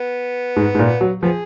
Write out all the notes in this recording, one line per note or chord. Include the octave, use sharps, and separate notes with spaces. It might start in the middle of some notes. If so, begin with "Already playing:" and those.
Already playing: B3
G#2
G#2
A#2
F#3
F3 B3 G#4